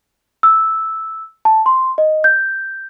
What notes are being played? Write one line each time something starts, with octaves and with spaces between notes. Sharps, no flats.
E6
A5
C6
D#5
G6